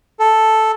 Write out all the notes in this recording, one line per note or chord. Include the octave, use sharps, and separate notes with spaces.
A4